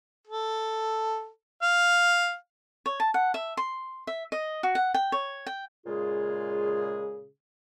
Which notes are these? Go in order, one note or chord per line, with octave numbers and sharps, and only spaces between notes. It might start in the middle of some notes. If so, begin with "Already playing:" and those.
A4
F5
C#5
A5
F#5
E5
C6
E5
D#5
F#4
F#5
G5
C#5
G5
A#2 C#3 G#3 F4 G#4